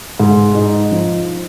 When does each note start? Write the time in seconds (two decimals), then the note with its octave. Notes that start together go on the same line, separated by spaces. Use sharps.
0.20 G#2
0.55 D#4
0.92 F3